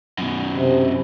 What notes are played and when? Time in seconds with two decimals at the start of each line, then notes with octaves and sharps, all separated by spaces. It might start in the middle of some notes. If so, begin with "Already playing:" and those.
0.18 F#2 B2
0.56 C3